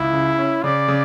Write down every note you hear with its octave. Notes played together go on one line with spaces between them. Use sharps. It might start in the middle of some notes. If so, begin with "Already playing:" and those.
Already playing: C#2 E4
C#3
C#4
C#3 D5
C#3